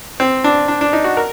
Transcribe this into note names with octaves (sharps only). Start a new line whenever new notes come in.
C4
D4
D4
D4
D#4
F#4
A#4